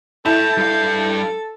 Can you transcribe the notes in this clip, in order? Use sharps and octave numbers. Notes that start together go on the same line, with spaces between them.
E4 A4 A5 B5 G6
G2 F5